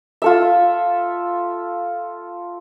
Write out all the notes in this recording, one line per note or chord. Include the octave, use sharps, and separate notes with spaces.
F4 A4 E5